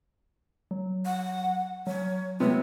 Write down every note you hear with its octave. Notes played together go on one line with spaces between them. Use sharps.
F#3
F#5
F#3 C#5
C3 B3 C#5